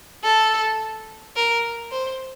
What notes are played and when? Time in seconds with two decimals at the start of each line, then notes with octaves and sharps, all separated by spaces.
0.24 A4
1.36 A#4
1.91 C5